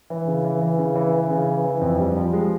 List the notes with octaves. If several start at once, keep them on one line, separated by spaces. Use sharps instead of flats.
E3
C#3
E3
E3
C#3
E3
E3
C#3
E3
E3
F2
G3
F3
G#3